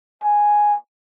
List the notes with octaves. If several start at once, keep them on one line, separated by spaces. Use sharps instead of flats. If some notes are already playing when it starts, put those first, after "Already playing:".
G#5